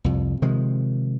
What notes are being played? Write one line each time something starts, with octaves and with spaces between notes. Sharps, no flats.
C2 F2
C3 D#3 F3 G#3